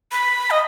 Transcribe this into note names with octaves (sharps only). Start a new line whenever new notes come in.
B5
D#5